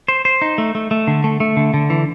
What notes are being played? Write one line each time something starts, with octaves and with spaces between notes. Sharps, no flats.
C5
C5
D#4
A3
A3
A3
D3
A3
A3
D3
D3
E3